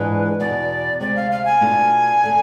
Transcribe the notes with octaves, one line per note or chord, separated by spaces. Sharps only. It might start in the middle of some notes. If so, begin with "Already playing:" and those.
Already playing: G#2 E3 G#3 D4 F4 B4
E2 B2 B3 D5
D2 C3 G#3 D5
F5
F5
G#5
B2 A3 D4 F4
D3 A3